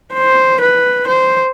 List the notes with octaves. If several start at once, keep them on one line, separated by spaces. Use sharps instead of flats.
C5
B4
C5